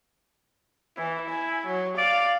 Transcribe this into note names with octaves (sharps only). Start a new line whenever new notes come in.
E3 E4
G#5
F#3
D5 F5